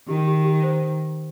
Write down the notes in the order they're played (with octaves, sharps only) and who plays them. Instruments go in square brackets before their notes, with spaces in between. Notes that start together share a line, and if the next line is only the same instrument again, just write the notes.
[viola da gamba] D#3 [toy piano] G4
[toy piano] G4
G4
C5